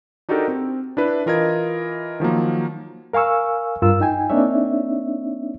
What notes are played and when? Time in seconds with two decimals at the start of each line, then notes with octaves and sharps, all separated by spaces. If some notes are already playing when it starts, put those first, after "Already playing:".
0.29 D4 D#4 F#4 G4 A4 A#4
0.48 C4
0.97 D4 E4 B4
1.26 E3 F4 A#4 D#5 G#6
2.20 D#3 F3 F#3 A#3
3.13 A#4 F5 G#5 C#6 E6
3.82 G2 F4 A#4 E6
4.00 D#4 G5 G#5
4.30 A#3 C4 D4 D#4 C#5 E5